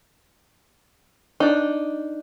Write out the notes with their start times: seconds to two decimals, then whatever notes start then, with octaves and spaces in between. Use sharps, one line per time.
1.40 D4 D#4